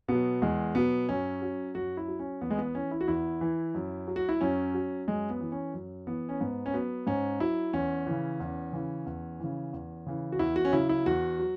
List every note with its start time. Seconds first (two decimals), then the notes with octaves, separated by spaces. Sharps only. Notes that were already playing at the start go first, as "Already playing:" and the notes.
0.08 B2 F#3 B3
0.42 E2 G#3
0.75 B2 F#3 B3
1.09 F#2 C#4
1.42 F#3
1.75 F#2 F#4
1.97 E4
2.08 F#3
2.19 C#4
2.41 E2 B3
2.50 G#3
2.58 B3
2.75 E3 C#4
2.91 E4
3.01 F#4
3.08 E2 E4
3.41 E3
3.75 F#2
4.07 F#3
4.16 F#4
4.29 E4
4.41 F#2 C#4
4.74 F#3
5.08 F#2 G#3
5.30 B3
5.41 E3
5.52 C#4
5.74 F#2
6.07 E3 B3
6.29 C#4
6.41 G#2 B3
6.66 C#4
6.73 F#3 B3
7.07 G#2 C#4
7.40 F#3 E4
7.73 E2 C#4
8.07 C#3 E3
8.40 E2
8.73 C#3 E3
9.06 E2
9.40 C#3 E3
9.73 E2
10.06 C#3 E3
10.32 F#4
10.39 E2 E4
10.56 F#4
10.65 C#4
10.73 C#3 F#3 E4
10.89 E4
11.06 E2 F#4
11.39 F#3